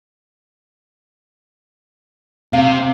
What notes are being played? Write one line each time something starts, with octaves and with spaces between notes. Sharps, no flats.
C3 F5